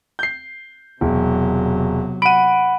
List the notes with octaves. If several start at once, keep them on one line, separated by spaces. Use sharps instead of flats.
G6 C7
E1 C3 F#3
F#5 B5 D7 D#7